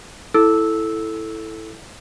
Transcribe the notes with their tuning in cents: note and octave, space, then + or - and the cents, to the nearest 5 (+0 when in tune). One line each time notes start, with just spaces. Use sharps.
E4 +0 A4 +0 E6 -10